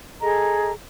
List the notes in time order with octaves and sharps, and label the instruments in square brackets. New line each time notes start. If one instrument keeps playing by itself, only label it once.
[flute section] G#4 A4 D#5 A#5